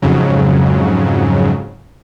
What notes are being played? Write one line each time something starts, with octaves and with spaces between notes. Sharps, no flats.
F2 G#2 C#3 F#3